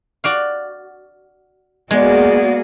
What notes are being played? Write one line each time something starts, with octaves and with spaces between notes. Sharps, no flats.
F#4 D5 F5
G#3 A#3 B3 F#4 G#4 D5